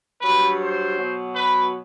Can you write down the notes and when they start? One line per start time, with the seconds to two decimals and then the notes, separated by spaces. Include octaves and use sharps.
0.21 G2 F#3 B4
0.59 C5
0.97 B2 F#3
1.35 B4